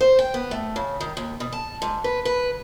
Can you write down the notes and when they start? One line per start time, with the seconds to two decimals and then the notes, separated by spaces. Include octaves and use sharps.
0.01 C5
0.19 G5
0.34 B3
0.51 A3
0.76 C#3
1.00 D#3
1.17 D#2
1.40 B2
1.52 A5
1.82 G#2
2.04 B4
2.25 B4